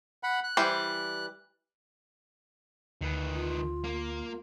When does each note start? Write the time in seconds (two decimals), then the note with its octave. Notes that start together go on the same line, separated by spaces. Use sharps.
0.23 F#5 B5
0.44 F#6
0.57 E3 G3 C5
3.01 D2 D#3 B4
3.34 F4
3.84 A#3